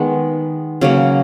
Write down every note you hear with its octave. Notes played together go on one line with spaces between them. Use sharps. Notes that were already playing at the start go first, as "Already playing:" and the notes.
Already playing: D#3 G#3 B3
C#3 F#3 A#3